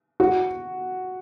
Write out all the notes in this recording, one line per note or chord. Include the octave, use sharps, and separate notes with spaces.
F#4